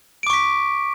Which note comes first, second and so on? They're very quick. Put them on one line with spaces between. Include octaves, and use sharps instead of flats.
D7 D6 C#6 B6